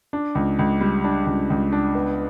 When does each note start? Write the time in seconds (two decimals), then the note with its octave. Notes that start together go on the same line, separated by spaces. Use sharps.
0.13 D4
0.35 C#2
0.59 C#2
0.81 G3
1.04 D4
1.26 C#2
1.50 C#2
1.72 D4
1.95 B3